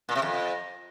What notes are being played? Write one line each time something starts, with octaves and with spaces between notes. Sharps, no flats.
A#2
C3
F2